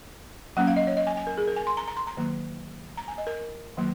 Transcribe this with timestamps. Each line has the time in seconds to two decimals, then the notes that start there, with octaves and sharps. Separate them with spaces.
0.57 F#3 A#3 C#4 F#5
0.67 F5
0.76 D#5
0.87 C#5
0.97 D#5
1.07 G#5
1.17 G#5
1.27 A#4
1.38 G#4
1.48 A#4
1.56 G#5
1.67 C6
1.77 A#5
1.88 A#5
1.97 C6
2.07 A#5
2.17 D#3 F#3 A#3
2.97 A#5
3.08 G#5
3.18 D#5
3.27 A#4
3.77 D#3 F#3 A#3